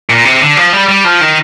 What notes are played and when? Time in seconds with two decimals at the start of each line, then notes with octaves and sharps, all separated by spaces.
0.10 A#2
0.25 C3
0.41 D3
0.57 F3
0.73 G3
0.88 G3
1.04 F3
1.21 D#3